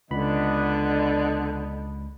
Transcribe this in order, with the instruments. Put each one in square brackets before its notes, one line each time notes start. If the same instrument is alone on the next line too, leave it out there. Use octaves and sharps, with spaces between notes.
[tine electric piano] C#2 B5 [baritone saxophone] D3 [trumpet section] B3 D4 D#5